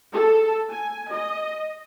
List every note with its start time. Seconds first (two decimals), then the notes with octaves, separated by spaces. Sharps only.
0.13 A4
0.71 G#5
1.11 D#5